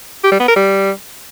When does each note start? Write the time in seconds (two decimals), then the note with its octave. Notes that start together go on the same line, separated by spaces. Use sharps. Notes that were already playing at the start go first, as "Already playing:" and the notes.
0.24 G4
0.32 G3
0.40 B3
0.48 A#4
0.56 G3